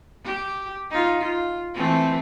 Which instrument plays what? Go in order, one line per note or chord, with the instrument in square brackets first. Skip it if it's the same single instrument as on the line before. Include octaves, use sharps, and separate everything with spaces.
[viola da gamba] G4
D#4 F4
F4
E3 A3 C4